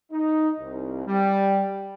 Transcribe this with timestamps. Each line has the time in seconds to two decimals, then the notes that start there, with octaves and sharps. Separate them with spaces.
0.12 D#4
0.60 C2
1.07 G3